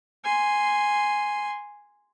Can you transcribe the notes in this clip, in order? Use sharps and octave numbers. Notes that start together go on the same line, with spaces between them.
G#5 C6